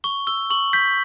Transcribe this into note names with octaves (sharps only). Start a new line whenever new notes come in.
C#6 G7
E6 G7
C#6 F#7
G6 B6